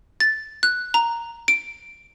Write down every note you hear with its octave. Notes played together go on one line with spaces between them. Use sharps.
A6
F#6
A#5
D7